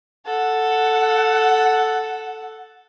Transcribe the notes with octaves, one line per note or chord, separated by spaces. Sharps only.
A4 F#5